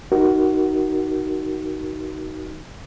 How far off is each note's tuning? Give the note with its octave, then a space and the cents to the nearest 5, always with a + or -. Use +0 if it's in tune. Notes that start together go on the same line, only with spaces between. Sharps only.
D#4 +0 F#4 +20 A#4 +0